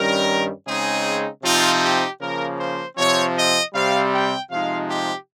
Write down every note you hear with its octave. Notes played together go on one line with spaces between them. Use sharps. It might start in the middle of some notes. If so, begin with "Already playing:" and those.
Already playing: G2 D#3 G3 C#4 A#4
C#3 G#3 C4 D#4 G#4
C3 F3 C4 D#4 F4
G4
C#3 F3 A#3 A#4
C5
C3 F3 C4 C#5
D#5
C3 G3 C4 F5
G5
C3 F3 G#3 D#4 F5
G4